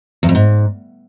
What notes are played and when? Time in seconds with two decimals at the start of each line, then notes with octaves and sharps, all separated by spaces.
0.23 E2
0.29 F2
0.35 G#2